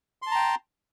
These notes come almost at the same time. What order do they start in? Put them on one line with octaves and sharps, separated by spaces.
C6 A5 A#5 G5